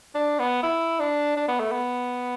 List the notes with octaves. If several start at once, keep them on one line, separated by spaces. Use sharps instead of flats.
D4
B3
E4
D4
D4
B3
A3
B3